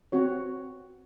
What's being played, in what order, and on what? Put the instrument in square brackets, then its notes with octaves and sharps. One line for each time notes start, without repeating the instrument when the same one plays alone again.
[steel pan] C4 F#4 C#5